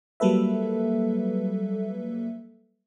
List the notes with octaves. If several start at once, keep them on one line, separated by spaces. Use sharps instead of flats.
F#3 G3 A#3 A4 B4 E5